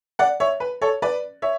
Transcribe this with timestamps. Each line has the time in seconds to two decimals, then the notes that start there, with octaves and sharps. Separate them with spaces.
0.19 D5 F#5
0.40 C#5 E5
0.60 B4
0.82 A4 C#5
1.02 B4 D5
1.42 C#5 E5